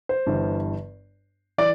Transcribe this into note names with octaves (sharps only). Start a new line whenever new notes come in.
C5
G1 G2 E3
E3 D5